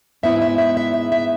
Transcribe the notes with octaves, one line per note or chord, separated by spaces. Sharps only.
G#2 G#3 B3 E4 E5
E5
E5
E5
E5
E5